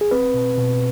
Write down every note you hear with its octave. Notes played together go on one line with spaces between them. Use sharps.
G#4
C4 B4
B2
B2